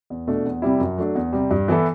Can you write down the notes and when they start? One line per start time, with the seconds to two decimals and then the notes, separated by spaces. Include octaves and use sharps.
0.10 E2
0.27 B2 A3 D4
0.45 E2
0.62 C3 G3 C4 E4
0.80 F#2
0.98 F#3 A3 D4
1.15 E2
1.33 C3 G3
1.51 G2
1.68 E3 B3 E4 A4